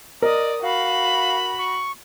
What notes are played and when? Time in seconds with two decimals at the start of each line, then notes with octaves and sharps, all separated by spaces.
0.22 A#4 D5 D#5 D#6
0.62 F#4 F5 B5
1.58 C#6